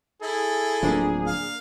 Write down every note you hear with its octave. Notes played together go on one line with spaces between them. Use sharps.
E4 G#4 A4
D1 F3 A#3 D4
F5